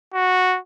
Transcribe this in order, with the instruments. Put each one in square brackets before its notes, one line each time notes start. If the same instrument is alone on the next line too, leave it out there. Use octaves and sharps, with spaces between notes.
[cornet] F#4